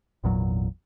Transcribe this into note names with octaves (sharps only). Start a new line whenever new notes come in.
G#1 E2 A#2 F#3